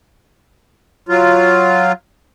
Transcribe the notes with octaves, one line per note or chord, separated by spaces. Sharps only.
F#3 F4